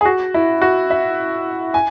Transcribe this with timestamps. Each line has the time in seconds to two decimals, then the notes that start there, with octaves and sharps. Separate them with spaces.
0.01 G#4
0.05 F#4
0.34 E4
0.62 F#4
0.90 E5
1.74 G#5